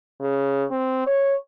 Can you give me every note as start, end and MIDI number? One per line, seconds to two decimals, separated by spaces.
0.21 0.64 49
0.71 1.05 60
1.07 1.35 73